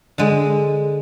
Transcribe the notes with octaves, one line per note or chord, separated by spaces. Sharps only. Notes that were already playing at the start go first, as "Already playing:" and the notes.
D3 G#3